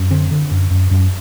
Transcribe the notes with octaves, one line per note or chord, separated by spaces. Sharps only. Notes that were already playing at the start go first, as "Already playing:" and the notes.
Already playing: F#2
D3 C4
D3
F#2
F#2
F#2